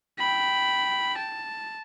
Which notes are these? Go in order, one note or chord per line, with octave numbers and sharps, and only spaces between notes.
G5 B5
A5